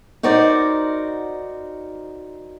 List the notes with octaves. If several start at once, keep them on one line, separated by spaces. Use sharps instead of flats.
D#4 F#4 A#4 C5 D5